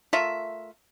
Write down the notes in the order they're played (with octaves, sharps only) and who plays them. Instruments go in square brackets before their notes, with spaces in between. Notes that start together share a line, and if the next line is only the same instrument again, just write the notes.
[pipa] A3 F4 A#4 E5